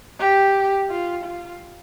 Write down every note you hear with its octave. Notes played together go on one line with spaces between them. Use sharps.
G4
F4
F4